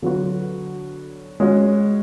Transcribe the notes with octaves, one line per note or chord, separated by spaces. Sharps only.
D3 F#3 B3 F#4
G#3 C#4 F#4